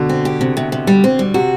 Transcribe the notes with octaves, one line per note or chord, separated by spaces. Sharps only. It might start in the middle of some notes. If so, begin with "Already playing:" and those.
Already playing: B2 D3
C4
G4
C3
C3
C3
G3
C4
G3
C3 F#4